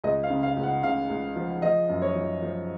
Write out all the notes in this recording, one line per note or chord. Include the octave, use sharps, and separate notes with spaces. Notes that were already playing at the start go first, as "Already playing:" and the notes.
C#2 D#5
F5
C#3
F5
C#2
F#5
C#3 F5
C#2
F3
F3 D#5
F#2
C#5
F3
F3